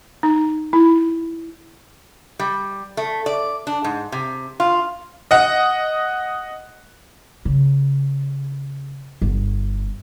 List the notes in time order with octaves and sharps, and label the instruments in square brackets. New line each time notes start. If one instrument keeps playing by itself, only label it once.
[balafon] D#4
E4
[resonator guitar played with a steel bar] G3
A3
D5
D4
G#2
C3
F4
[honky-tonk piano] D#5 F#5
[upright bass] C#3
G1